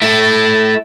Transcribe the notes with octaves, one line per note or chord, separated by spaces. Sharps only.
A3 E4